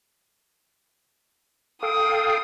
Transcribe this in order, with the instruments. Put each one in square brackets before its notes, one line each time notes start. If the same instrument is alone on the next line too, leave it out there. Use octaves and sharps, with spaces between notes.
[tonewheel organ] A4 F5 G5 [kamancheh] D#6